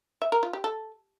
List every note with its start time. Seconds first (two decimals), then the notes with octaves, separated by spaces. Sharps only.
0.22 E5
0.32 A#4
0.43 F4
0.53 G4
0.64 A4